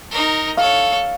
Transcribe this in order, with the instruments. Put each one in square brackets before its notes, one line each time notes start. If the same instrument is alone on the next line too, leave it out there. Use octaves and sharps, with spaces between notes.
[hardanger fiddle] D#4 A#4
[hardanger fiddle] A4 C#5 [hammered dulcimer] F5